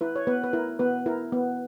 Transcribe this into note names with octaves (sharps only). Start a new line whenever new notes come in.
E4 B4
C#5
B3 B4
B4
E4 A#4
B3 B4
E4 A#4
B3